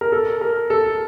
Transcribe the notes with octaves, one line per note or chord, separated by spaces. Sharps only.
A#4
A4
A#4
A4